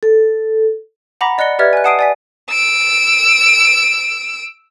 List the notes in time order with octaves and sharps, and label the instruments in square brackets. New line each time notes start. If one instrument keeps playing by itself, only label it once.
[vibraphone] A4
[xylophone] F#5 A#5 B5 D6 A#6 B6
D5 D#5 F#6 A#6 C#7 G7
G4 B4 D5 E5 F6 G#6
G#5 F#6
F#5 A5 D#6 C7 D7 D#7
D5 G#5 B6
[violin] E6 D7